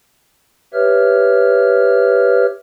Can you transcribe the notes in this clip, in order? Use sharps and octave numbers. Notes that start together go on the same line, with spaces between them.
G4 B4 C#5 E5 F6